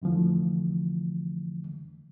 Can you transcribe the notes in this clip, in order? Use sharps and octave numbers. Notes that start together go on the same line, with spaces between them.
F2 D3 E3 F3 A3